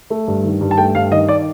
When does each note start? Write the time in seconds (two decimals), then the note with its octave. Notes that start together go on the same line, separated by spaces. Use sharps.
0.10 A3
0.27 G2
0.44 D#3
0.61 G2
0.71 A5
0.77 A3 G5
0.95 G2 F5
1.11 D#3 D#5
1.28 D5